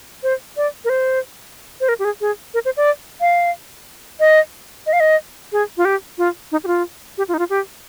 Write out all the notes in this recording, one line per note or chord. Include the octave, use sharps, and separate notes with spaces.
C5
D5
A#4
C5
C5
A#4
G4
G#4
G#4
A#4
C5
D5
F5
D#5
D#5
F5
D#5
G#4
F4
G4
F4
D#4
G4
F4
G4
F4
D#4
F4
G4